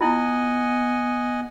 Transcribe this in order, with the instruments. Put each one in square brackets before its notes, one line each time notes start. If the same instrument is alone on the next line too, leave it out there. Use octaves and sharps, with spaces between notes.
[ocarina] B3 [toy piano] E4 F4 [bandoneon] D#5 F#5 G#5